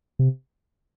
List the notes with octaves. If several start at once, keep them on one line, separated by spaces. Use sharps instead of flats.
C3